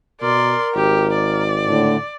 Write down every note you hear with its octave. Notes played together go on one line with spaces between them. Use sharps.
B2 A#4 D5 C6
G#1 G4
D5
A2 D3